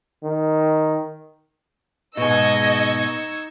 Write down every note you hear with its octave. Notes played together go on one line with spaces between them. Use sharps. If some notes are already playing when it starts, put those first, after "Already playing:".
D#3
G#2 B2 D#4 D#5 C#6 E6 G#6